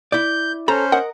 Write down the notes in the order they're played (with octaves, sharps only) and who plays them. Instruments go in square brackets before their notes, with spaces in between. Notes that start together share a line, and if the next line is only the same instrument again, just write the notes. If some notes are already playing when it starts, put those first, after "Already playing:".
[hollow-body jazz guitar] E4 D5 [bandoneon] G6
[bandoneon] C#4 C5 [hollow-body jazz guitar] A4 [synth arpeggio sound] A#5
[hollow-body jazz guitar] A#4 D#5 [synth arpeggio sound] F#5